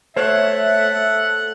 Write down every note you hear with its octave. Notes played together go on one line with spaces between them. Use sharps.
A3 C5 C#5 E5 F#5